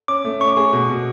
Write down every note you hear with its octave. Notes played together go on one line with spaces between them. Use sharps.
C#4 D6
A3
C#4 C#6
G#4
B2
B2